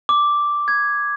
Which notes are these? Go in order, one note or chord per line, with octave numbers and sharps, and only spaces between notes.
D6
G#6